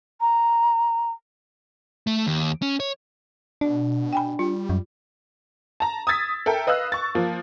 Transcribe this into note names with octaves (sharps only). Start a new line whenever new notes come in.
A#5
A3
D#2
C#4
C#5
B2 D4
G5 G#5 B5
G3 F4
F#2
A5 A#5
D#6 E6 G#6 A6 B6
A4 A#4 E5 G5
B4 D#5 F5 E6 F#6
C#6 A6
F3 A#3